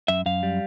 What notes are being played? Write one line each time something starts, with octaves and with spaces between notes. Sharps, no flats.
F#2 E5
F#2 F5
G3